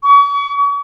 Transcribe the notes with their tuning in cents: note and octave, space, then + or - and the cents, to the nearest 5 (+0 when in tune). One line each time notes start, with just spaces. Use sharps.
C#6 +40